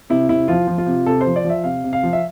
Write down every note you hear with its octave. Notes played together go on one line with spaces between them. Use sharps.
C3 E4
C3 E4
F3 F4
F3
F4
C3
C3 A4
C5
F3
D5
F3
E5
C3 F5
C3
F5
F3
E5